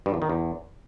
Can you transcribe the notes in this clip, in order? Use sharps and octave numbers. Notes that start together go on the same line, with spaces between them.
G2
E2
D#3
E2